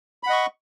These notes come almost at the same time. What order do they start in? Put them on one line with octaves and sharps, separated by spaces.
B5 F#5 D#5 C#6